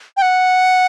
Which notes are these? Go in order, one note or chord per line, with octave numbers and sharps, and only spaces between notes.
G5
F#5